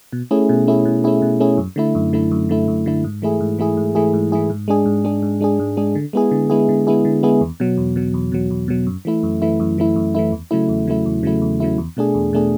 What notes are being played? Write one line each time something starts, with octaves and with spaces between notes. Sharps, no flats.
B2
A3 C#4 E4 G#4
B2
A3 C#4 E4 G#4
B2
A3 C#4 E4 G#4
B2
A3 C#4 E4 G#4
F#2
D3 A3 E4
F#2
D3 A3 E4
F#2
D3 A3 E4
F#2
D3 A3 E4
G#2
E3 A3 E4 G#4
G#2
E3 A3 E4 G#4
G#2
E3 A3 E4 G#4
G#2
E3 A3 E4 G#4
G#2
G#3 D4 G#4
G#2
G#3 D4 G#4
G#2
G#3 D4 G#4
G#2
G#3 D4 G#4
D3
G#3 B3 E4 G#4
D3
G#3 B3 E4 G#4
D3
G#3 B3 E4 G#4
D3
G#3 B3 E4 G#4
E2
B2 F#3
E2
B2 F#3
E2
B2 F#3
E2
B2 F#3
F#2
E3 A3 E4
F#2
E3 A3 E4
F#2
E3 A3 E4
F#2
E3 A3 E4
E2
C#3 F#3 A3 E4
E2
C#3 F#3 A3 E4
E2
C#3 F#3 A3 E4
E2
C#3 F#3 A3 E4
E2
B2 A3 D4 G#4
E2
B2 A3 D4 G#4